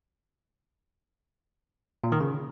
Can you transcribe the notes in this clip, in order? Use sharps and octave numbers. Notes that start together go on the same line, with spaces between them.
A#2
D#3
C#3